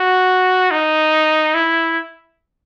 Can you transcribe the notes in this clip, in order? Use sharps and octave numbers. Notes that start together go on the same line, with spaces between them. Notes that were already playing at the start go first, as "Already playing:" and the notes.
Already playing: F#4
D#4
E4